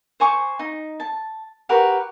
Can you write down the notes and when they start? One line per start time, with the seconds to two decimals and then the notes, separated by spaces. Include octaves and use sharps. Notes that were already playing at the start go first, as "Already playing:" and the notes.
0.20 C5 G#5 C#6 D6
0.59 D#4
1.00 A5
1.69 F#4 G4 A#4 B4